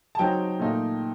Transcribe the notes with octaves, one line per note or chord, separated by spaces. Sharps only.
A5
F#3 C4 D#4 G5
A#2 A3 D#4